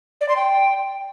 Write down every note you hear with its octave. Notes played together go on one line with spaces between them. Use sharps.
D5
C6
G5